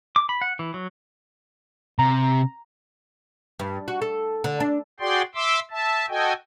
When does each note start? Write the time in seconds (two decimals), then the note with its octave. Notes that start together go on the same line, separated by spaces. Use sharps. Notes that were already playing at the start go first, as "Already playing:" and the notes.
0.16 D6
0.29 B5
0.41 F#5
0.59 E3
0.74 F#3
1.99 C3 A#5
3.59 G2
3.88 F#4
4.02 A4
4.44 D3
4.60 D4
5.00 F#4 G#4 D5 G5 C6
5.35 E5 C6 D6 E6
5.71 E5 A5
6.09 F#4 A4 D#5 G5 G#5